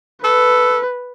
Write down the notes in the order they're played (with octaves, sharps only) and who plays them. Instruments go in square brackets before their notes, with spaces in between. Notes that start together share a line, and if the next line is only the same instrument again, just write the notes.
[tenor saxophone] A4 [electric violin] B4